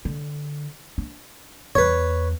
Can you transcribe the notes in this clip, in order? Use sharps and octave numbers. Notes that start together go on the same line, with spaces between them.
D3
D4
E2 B4 C#5